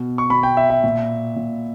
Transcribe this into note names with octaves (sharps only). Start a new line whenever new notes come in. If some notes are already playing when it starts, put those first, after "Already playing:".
Already playing: B2
C#6
B2 B5
G5
E5
E5
A#2
A#2